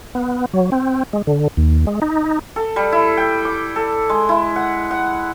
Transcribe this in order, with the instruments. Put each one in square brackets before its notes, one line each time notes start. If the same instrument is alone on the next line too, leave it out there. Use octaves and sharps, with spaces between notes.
[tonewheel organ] B3
F#3
C4
G#3
D3
D#2
G#3
D#4
[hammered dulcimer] A4
G3
E4
G5
D6
A4
G#3
E4
F#5
F#5